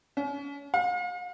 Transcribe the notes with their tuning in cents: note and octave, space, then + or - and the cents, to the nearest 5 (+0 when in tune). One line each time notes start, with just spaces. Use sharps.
C#4 +35
F5 +40